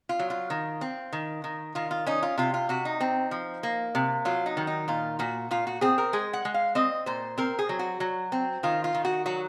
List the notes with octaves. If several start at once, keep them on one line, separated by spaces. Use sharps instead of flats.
F4
F#3
F4
D#3
C4
D#3
D#3
D#3 F4
F4
C#4 D#4
F4
C3 F4
F4
C3 F#4
D#4
C4
F3
A#3
C3
F#3 F4
D#4
D#3
D#4
A#2 F4
A#2 F#4
A#2 F4
F#4
C4 G#4
A#4
G#3 G#4
F#5
G#3
F5
C4 D#5
A#2 C5
C4 A#4
G#4
F#3
F#4
F#3
C4
D#3 F4
F4
D#3
F#4
F#3 F#4